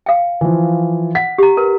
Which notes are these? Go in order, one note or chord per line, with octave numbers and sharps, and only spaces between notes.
F5 G5
E3 F3
F#5 B6
G4 A#5
A#4 B4